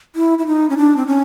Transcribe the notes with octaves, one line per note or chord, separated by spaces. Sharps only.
E4
E4
D#4
C#4
D4
C4
C#4